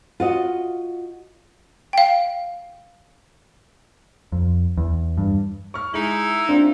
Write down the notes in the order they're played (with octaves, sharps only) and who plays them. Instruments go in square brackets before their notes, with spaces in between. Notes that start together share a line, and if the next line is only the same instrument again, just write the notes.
[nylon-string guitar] F4 F#4 D#5
[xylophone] F5 G5
[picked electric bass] F2
E2
G2
[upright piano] C#6 F6
[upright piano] G#3 F#7 [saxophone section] D#4 E4
[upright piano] A#3 C4 F4 [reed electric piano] D4